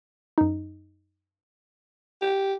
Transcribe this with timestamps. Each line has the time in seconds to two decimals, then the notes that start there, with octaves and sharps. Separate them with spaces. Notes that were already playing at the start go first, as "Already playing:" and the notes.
0.38 F#2 D#4
2.21 G4